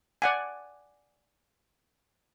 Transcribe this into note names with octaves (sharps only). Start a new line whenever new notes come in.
D5 F#5 G#5